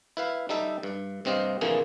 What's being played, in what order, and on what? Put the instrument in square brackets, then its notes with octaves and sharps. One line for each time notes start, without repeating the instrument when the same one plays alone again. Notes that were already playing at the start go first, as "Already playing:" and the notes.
[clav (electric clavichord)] E4 B4 F5
G3 D#4 A4 E5
G2
G2 C3 C4 D#5 F5
F2 A#2 D3 E3 A#3 G#4